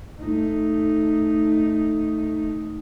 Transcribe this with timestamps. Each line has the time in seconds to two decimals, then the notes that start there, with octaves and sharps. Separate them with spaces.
0.19 A3 D#4